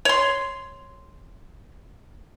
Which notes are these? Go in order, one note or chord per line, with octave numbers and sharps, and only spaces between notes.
C#5 C6